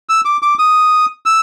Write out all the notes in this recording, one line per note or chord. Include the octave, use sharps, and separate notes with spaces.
E6
D6
D6
D#6
E6